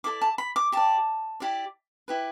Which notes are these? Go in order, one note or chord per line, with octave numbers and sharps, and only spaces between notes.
E4 A4 D5 D6
A5
B5
D6
G4 D5 A5
E4 G4 D5
E4 G4 B4